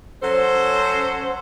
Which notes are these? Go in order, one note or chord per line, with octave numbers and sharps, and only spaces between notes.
F#3 C#4 A4 C5